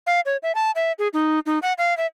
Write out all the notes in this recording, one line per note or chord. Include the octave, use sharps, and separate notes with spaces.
F5
C#5
E5
A5
E5
G#4
D#4
D#4
F#5
F5
E5